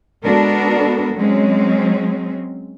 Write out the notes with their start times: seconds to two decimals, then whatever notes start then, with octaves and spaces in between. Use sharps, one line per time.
0.24 G#3 B3 D4 F#4 A4 A#4
1.15 F#3 G#3 C4 C#4